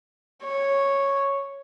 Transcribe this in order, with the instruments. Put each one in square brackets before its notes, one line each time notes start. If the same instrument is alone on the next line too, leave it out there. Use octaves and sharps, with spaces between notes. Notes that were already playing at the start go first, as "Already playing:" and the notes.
[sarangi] C#5